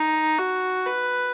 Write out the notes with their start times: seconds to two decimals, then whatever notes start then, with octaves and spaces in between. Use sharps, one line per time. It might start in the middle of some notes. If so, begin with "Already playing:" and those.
Already playing: D#4
0.39 F#4
0.86 B4